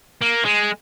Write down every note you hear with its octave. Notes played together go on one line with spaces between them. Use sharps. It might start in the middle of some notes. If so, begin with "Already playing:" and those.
A#3
G#3